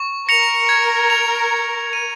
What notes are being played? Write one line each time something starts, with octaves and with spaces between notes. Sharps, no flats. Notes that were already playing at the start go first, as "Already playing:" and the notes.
Already playing: C#6
A#4 A#6 C#7 F7
G#6
F7
G#6
D#7